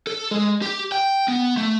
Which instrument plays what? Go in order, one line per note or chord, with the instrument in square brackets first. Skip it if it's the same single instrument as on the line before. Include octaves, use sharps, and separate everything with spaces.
[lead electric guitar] A4
G#3
G4
G5
B3
A3